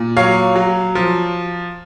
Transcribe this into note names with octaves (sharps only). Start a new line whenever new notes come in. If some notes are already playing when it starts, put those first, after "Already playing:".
Already playing: A#2
F#3 C#5 F5
F#3
F3